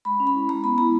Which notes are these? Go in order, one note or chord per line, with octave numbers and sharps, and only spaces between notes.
G#3 B5
C#4
B5
E4
G#3 A#5
B3 B5
E4 A#5